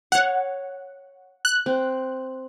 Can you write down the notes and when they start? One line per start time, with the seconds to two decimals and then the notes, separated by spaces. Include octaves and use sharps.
0.12 C#5 F5 F#5
1.45 F#6
1.66 C4